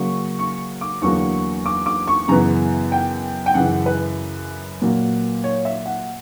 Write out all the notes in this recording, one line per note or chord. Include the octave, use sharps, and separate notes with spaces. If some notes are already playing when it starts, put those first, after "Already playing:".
Already playing: C#3 F#3 A#3 C#6
C#6
D6
E2 D3 F#3 A#3 C#6
D6
D6
C#6
F#2 C#3 E3 B3 A#5
G5
G5
F#2 C#3 E3 F#5
B4
A#2 F#3 A#3
C#5
E5
F#5